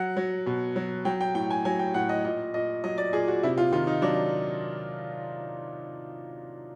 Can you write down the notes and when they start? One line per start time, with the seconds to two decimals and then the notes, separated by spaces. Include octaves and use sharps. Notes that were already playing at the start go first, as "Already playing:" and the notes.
Already playing: F#3 F#5
0.17 F#3
0.46 B2
0.76 F#3
1.05 F#3 G5
1.21 G5
1.35 A2 G5
1.50 G#5
1.65 F#3 G#5
1.79 G5
1.94 A2 F#5
2.09 D#5
2.24 A#2 D#5
2.54 A#2 D#5
2.84 F#3 D#5
2.98 D5
3.13 A#2 G#4
3.28 F#4
3.43 C3 E4
3.58 F4
3.72 D#3 F4
3.87 D#4
4.02 F#3 D4